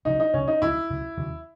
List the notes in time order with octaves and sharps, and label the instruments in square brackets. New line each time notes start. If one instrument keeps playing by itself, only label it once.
[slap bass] C#2 C#3 F#3 [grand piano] D#4
[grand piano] D#4
[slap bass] C#2 C#3 F#3 [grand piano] C#4
[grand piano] D#4
[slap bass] C#2 C#3 F#3 [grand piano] E4
[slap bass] C#2 C#3 F#3
D#2 C#3 F#3